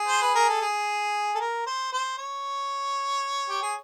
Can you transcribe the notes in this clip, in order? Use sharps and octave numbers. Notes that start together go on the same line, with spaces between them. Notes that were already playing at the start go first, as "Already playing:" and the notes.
Already playing: G#4
C5
B4
A#4
A4
G#4
A4
A#4
C5
C5
C#5
G4
G#4